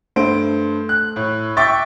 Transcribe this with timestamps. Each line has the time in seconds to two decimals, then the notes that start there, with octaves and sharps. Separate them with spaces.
0.16 G2 A3 C5 D7
0.89 F#6
1.16 A2
1.57 E5 G5 C#6 D6 A6